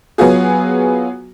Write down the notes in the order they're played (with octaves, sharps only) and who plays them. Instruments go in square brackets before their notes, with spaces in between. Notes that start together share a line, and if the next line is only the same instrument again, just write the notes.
[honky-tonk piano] F#3 B3 F4 F#4 G#4